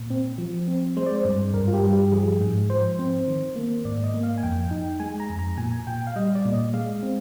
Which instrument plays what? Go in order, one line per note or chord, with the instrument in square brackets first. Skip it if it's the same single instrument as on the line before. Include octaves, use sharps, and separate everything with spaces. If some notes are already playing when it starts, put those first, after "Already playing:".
Already playing: [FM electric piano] A#2
C4
F3
C4
G#3 C5
D5
C5
G2
G2 A#4
F4
G4
G2
G4
F3 G#4
G#2
F3 C5
C4
D#3
A#3
G#2 D5
D#5
A#3
F5
G#5
F2 G5
D#4
G#3 G#5
A#5
F2
A#5
A#2 G#5
A#2 G5
F5
G3 D#5
D5
A#2
D#5
G#3 F5
C4